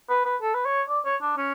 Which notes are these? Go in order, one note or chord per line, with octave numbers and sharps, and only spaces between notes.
B4
B4
A4
B4
C#5
D5
C#5
D4
C#4